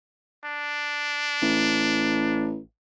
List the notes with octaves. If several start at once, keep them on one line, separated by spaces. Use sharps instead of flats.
D4
A1